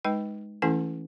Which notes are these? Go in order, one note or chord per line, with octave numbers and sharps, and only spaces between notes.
G#3 D#4 B4 G5
E3 A3 C#4 E4 A4 G#5